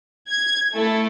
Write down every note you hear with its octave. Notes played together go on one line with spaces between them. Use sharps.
G#6
A3 E4 A4